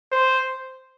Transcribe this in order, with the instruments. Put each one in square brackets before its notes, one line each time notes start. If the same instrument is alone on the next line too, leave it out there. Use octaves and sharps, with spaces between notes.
[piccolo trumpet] C5